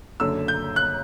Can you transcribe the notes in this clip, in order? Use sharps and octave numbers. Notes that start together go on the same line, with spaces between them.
F#1 F#2 D3 E6
G6
F#6